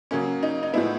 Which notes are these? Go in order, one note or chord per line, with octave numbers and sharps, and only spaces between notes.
C#3 F#3 A#3 C#4
D#4
D#4
A2 F3 G#3 B3 E4